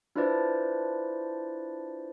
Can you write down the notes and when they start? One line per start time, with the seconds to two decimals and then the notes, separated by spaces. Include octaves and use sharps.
0.16 D4 E4 F4 B4 C5 D5